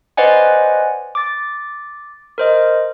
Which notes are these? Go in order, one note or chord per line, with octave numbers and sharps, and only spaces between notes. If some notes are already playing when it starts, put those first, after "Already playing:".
B4 C5 D5 D#5 F#5 G#5
D6 A6
A#4 C5 D#5